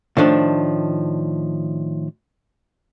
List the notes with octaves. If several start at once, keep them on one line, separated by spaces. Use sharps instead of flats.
A2 D#3 F3 D4